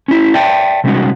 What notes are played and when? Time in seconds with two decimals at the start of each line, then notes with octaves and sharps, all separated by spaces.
0.08 C#4 E4
0.34 D5 E5 G5 A5
0.84 C3 G3 G#3 C#4 D#4 F#4